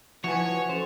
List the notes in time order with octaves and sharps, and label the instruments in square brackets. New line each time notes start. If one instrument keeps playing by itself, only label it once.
[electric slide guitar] F3 E4 [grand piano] F#4 G#5 [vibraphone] B4 F#5 [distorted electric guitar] C#5
[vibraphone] C#4 A4 [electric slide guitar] C5